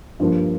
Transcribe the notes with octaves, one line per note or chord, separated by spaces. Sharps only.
G2 F3 A#3